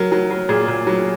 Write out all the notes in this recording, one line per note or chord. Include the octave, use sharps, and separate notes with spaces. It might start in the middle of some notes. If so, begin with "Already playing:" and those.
Already playing: F#3 A#4
F#3
F#3
A#2 G#4
A#2
F#3